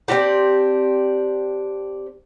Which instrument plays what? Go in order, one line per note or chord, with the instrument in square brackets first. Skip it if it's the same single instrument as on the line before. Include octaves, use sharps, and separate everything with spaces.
[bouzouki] C4 D4 F#4 G4